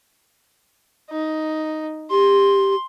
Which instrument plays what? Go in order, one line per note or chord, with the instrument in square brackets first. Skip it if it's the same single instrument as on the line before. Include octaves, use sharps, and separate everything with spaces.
[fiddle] D#4
[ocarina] G4 [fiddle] C6